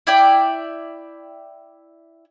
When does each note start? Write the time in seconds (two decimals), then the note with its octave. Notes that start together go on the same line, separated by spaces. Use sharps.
0.07 E4 D5 G5